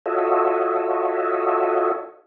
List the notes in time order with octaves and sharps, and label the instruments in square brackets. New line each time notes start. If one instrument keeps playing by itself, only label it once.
[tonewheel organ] F4 F#4 A4 C#5 D#5 E5